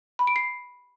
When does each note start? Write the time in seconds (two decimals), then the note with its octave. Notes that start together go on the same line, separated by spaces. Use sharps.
0.19 B5
0.27 D7
0.36 C7